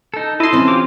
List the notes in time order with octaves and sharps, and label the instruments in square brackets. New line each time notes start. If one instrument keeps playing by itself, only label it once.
[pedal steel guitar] D#4 A4
[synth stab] E4 C6 [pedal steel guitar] A4 D#5
[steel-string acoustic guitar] E3 C4 C#4
[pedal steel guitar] F4 G4 D6